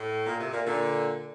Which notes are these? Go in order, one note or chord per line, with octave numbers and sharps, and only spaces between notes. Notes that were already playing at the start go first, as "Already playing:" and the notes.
Already playing: A2
A#2
C3
A#2
A#2 D3